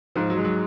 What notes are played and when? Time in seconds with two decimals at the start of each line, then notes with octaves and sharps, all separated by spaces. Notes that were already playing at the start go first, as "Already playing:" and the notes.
0.16 G#2 F3
0.30 F#3
0.37 G#3
0.44 F#3